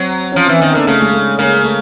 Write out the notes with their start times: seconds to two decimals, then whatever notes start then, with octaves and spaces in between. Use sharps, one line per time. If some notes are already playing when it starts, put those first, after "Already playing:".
Already playing: F#3 C4
0.32 F3 C#4
0.46 E3 C4
0.60 D#3 B3
0.73 D3 A#3
0.87 C#3 A3
1.02 G#3
1.13 A3
1.39 C#3 A#3
1.64 A3